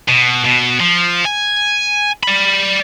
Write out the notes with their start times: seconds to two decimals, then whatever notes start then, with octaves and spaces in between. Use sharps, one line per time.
0.09 B2
0.45 B2
0.80 F3
1.25 G#5
2.23 D5 B5